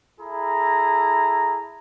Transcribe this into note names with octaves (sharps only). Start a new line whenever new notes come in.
E4 G#4 A4 A#5